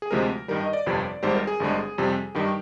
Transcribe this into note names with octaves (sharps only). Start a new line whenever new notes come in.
G#4
D2 C3 F3 G#3 A#4
G2 D#3 G3 A#4
D#5
D5
G1 F2 C3
G#1 G#2 G3 C5
A#4
G#4
G#1 G2 D3 G#3
F2 C3 G3
G2 D#3 G3 G4